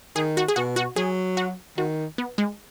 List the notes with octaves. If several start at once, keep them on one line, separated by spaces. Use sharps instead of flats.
D#3 G#4
F#4
G#4
B2 F#4
F#4
F#3 G#4
F#4
D#3 F#4
B3
G#3